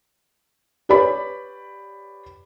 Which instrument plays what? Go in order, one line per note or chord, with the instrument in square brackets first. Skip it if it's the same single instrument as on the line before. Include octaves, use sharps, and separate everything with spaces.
[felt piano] G4 B4 C#5 D5 B5